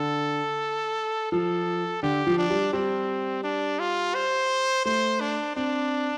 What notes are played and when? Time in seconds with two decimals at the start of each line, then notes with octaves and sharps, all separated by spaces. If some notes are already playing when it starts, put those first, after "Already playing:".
Already playing: D3 A4
1.32 F3 A4
2.03 D3 G4
2.27 F3
2.38 D4
2.50 G3
2.73 G3 C4
3.44 D4
3.79 F4
4.15 C5
4.85 A3 C5
5.20 D4
5.56 C4 D4